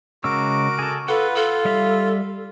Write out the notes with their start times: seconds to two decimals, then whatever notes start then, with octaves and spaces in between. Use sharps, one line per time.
0.24 C#3 G#3 F#4 A#4 D6 E6
0.79 G#4 A4
1.08 F4 A4 B4 F#5
1.35 F4 A4
1.65 G3 E5 F5